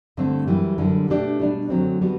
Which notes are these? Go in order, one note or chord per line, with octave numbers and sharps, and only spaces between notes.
G2 D3 A3 C4
F#2 E3 G3
F#2 D3 G3
B2 A3 D4 G4 D5
B2 G3 D4
F#2 D3 F#3 A3 C4
D3 G3 B3 F#4